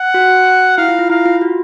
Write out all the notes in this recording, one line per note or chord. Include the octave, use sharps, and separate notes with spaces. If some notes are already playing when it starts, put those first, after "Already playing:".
Already playing: F#5
F#4
E4 F5
F4
F4
E4 F5
F4
F#4